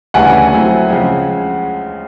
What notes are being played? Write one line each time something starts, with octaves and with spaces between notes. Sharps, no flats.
D2 C#3 E3 G3 F#5 G#5
F#3 A3 C4 E4
C#3 F3 G#3 C4